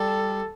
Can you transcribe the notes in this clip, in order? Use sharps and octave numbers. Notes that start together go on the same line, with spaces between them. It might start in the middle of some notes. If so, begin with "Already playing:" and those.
Already playing: G3 A4